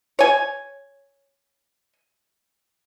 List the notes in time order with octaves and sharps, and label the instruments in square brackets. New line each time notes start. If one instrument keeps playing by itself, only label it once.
[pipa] C#5 G#5